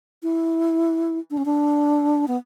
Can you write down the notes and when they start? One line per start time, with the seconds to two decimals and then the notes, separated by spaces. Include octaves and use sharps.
0.23 E4
1.31 D4
1.37 C#4
1.45 D4
2.28 B3